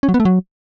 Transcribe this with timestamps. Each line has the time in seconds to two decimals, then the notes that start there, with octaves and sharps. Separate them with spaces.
0.03 C#4
0.09 F#3
0.14 B3
0.20 A3
0.25 F#3